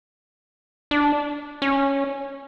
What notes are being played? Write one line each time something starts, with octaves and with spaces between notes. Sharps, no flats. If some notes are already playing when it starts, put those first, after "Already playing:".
D4
C#4